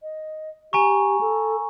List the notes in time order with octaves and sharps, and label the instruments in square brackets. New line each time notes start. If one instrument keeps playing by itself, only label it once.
[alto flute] D#5
[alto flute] G4 [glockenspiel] G#5 A#5 C#6
[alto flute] A4